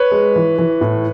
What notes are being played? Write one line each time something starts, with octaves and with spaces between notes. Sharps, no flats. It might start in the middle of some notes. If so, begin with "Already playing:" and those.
Already playing: B4 C#5
G#3
E3
E3
A2